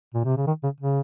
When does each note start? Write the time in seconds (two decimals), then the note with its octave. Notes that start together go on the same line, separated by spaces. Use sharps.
0.14 A#2
0.24 C3
0.37 C#3
0.47 D#3
0.63 C#3
0.80 C#3